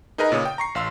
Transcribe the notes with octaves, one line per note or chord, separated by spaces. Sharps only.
D#4 G#4 A#4 B4 D#5 A#5
A#2 C#3 C#5 D#6
G5
A#5 C#6 C7
A1 F5 C6 E6